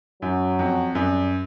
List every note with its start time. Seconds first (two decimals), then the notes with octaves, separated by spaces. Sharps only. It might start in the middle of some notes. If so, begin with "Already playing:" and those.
0.22 F#2 F#3
0.59 F2
0.95 F#2 G3